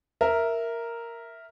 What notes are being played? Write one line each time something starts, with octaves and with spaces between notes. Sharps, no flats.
A#4 E5